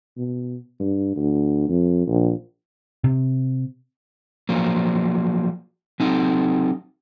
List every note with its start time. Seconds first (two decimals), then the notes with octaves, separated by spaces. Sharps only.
0.18 B2
0.80 G2
1.16 D2
1.69 F2
2.07 A#1
3.04 C3
4.49 F3 F#3 A#3
6.00 F#3 C4 D#4